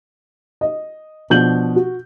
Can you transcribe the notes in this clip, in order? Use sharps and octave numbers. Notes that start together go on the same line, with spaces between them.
D#5
B2 F3 D4 G6 F#7
F#4